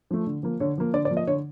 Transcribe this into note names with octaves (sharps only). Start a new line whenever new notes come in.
F3 A3
D3
F3 A#3
D3 C#5
F3 A#3
D3 D5
D5
F3 A#3
D#5
D3 C#5